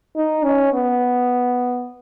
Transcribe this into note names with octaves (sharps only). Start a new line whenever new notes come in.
D#4
C#4
B3